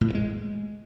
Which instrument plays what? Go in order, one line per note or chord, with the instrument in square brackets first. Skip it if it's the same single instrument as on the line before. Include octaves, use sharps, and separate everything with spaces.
[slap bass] A2
G2
G#3